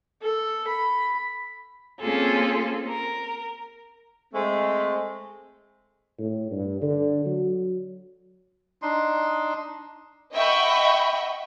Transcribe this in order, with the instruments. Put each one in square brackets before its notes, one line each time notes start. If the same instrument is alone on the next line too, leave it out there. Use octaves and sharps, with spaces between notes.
[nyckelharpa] A4
B5
[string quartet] A#3 C4 C#4 F4 G#4 A4
A#4
[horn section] G#3 A3 C4
[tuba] A2
G2
D3
F#3
[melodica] D4 D#4 C6
[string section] D#5 E5 F#5 G5 B5 C#6